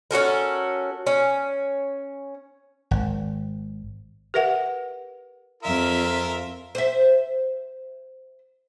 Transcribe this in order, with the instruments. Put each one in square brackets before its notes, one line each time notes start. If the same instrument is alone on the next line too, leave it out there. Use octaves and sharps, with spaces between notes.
[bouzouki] C#4 F#4 A4 A#4
C#4
[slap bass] G#1
[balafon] G4 A#4 B4 E5 F#5
[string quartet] F2 E5 [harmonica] F4 A#4
[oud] C5 E5